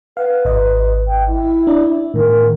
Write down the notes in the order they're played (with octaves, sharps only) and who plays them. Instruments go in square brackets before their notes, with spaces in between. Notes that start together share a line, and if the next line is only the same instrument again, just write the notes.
[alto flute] B4 [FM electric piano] F5 F#5
[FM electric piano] G#1 D#5
[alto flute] G5
E4
[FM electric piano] D4 D5
[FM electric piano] A2 D#3 [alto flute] A#4